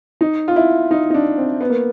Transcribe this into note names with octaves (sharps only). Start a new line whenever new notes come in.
D#4
F4
E4
D#4
D#4
D4
C4
B3
A#3